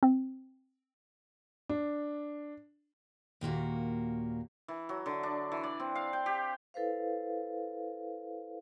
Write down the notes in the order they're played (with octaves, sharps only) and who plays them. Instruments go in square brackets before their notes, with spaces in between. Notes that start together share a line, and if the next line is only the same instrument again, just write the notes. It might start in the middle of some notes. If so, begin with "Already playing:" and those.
[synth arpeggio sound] C4
[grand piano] D4
[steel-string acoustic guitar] D#2 A#2 A#3 F#4
[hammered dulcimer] E3
F#3
D3
D4
E3
D5
C4
F5
G5
G4
[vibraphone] E4 A4 B4 C5 F5